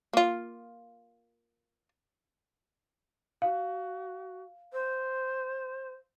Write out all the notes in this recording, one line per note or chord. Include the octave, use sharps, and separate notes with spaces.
A#3 F4
F#4 F5
C5